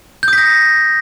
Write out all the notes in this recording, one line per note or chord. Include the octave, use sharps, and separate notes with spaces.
D#6 G6 A#6 B6